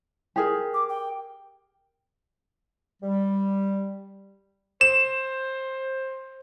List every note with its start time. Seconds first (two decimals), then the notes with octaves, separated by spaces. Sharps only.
0.36 G4 G#4 A#4
0.74 D6
0.89 G5
3.02 G3
4.81 C5 E7